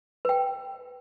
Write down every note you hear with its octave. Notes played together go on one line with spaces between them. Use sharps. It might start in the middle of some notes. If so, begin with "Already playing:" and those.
B4 G5